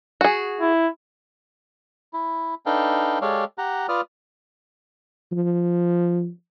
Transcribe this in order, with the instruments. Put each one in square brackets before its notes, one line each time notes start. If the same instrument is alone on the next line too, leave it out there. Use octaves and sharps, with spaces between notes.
[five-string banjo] F#4 G#4
[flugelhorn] E4
[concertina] E4
D4 D#4 A4 B4 F5 G5
G#3 G4 A4 C#5 D5 F5
G4 F#5 A#5
F4 B4 D5 D#6 F6
[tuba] F3